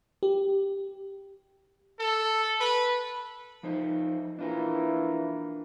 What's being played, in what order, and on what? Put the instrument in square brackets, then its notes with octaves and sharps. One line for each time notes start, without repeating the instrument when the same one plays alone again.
[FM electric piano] G4
[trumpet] A4
B4
[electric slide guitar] F3 D#4 C5
[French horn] E3 [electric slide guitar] D4 F4 A#4